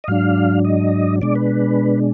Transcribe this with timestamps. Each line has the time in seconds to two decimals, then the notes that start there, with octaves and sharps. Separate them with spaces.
0.04 D#5
0.08 G#2 F#3 D4 F5
0.64 D#5
1.22 B2 G#3 D4 D5
1.35 B4